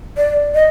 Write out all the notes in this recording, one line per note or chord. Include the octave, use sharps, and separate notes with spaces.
D5
D#5